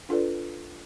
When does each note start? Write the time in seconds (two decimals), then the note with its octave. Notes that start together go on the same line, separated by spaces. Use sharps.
0.09 D4 F4 A4 B4 D5